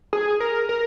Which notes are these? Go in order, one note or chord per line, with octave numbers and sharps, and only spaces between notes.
G#4
A#4
A#4